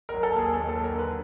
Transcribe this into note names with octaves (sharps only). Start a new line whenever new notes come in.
A#4
F#3
A4
D#2
G#4
D#2 A4
A4
F#3
A#4
D3
B4